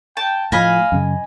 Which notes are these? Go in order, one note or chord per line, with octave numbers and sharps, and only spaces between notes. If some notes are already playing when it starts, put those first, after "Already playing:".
G5 A5
A2 F3 D#5 F5 G#5 B5
F#2 C#3